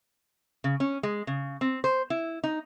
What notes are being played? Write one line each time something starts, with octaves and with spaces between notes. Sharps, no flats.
C#3
C#4
G#3
C#3
C4
C5
E4
D#4